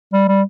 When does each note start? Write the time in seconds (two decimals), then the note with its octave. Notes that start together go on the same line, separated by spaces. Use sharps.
0.13 G3
0.28 G3